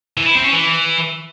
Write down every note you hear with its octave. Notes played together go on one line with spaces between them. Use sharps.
E3
E4
C4
C#4
E3